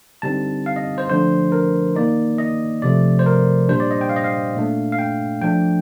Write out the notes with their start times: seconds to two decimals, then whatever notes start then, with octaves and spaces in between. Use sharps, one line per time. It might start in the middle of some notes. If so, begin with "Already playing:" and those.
0.22 D3 G3 C4 D#4 A5
0.66 F5
0.76 D#5
0.98 C5
1.09 D3 F3 A3 D4 C5
1.52 A#4
1.96 D#3 A#3 D#4 D5
2.38 D#5
2.82 C3 F3 A3 D5
3.19 C5
3.26 A#4
3.69 A#2 G3 D4 C5
3.80 D5
3.91 D#5
4.01 G5
4.09 F5
4.16 D#5
4.24 F5
4.55 A#2 A3 D4
4.92 F5
4.99 G5
5.41 F3 A3 D4 G5